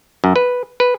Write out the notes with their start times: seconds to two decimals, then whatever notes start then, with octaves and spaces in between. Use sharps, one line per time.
0.24 F#2
0.36 B4
0.80 B4